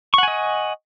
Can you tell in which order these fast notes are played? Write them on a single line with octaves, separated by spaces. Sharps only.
C#6 F#5 G#5 D#5